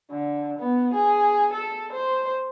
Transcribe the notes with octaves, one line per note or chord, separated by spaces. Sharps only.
D3
B3
G#4
A4
C5